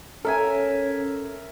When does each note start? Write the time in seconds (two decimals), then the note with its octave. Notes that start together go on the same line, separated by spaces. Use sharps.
0.25 C#4 A4 A#4 E5 G#5